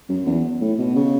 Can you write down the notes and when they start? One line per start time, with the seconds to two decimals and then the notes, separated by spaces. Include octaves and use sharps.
0.09 F#2
0.26 E2
0.61 A2
0.78 B2
0.95 C#3